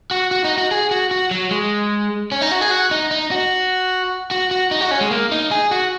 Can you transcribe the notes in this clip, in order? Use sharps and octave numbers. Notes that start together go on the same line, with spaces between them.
F#4
F#4
D#4
F#4
G#4
F#4
F#4
F#3
G#3
C#4
D#4
F#4
G#4
F#4
D#4
D#4
F#4
F#4
F#4
D#4
F#4
C#4
G#3
A#3
D#4
G#4
F#4